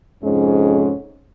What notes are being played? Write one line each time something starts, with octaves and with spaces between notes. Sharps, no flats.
F2 G#2 C3 G#3 C#4